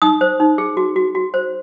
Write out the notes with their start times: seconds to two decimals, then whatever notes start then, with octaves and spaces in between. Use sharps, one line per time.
0.02 D#4 D#6
0.21 C5
0.40 D#4
0.58 G#4
0.77 F#4
0.96 F#4
1.15 F#4
1.34 C5